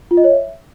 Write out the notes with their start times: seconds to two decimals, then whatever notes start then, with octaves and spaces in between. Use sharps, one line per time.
0.11 F4
0.17 D#5
0.24 C#5
0.31 E5